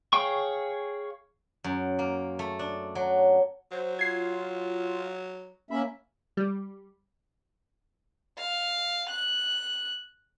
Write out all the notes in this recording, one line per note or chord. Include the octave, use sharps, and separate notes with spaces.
G#4 C#5 F5 G5 C#6
F#2
A#3
A3
D4
F#3
F#3 C5
F4 G#6 C7
A#3 C#4 E5 B5
G3
F5
F#6